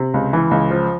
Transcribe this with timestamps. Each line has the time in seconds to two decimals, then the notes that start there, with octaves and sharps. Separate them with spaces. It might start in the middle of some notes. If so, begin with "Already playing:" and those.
Already playing: C3
0.14 C#2
0.33 E3
0.51 C#2
0.71 F3